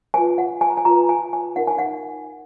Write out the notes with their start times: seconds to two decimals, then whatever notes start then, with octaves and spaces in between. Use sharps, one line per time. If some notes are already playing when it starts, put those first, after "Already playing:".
0.14 F4 B4 G#5
0.38 F#5
0.61 G#5
0.70 A#5
0.77 G#5
0.85 F4 B4 A#5
1.09 G#5
1.33 G#5
1.56 D#4 A#4 F#5
1.67 G#5
1.78 F#5